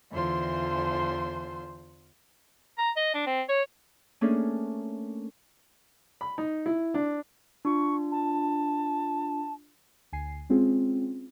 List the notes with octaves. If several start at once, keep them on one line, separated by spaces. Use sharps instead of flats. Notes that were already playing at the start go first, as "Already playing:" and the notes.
E2 D3 E3 F4 C5 C6
A#5
D#5
D4
C4
C#5
A3 A#3 C#4 D4 G#4 A4
B5
D#4
E4
D4
D4 F4 C#6
A5
D2 G#5 C7
G#3 C4 C#4 F4 G#4